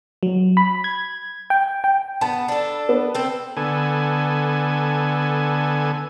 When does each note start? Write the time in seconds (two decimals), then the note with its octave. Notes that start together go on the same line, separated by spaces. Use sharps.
0.23 F#3
0.57 B5
0.84 G#6
1.50 G5
1.84 G5
2.21 B3 A5
2.48 D4 A4
2.89 B3
3.14 C4 A4
3.57 D3 B3 A4 G#5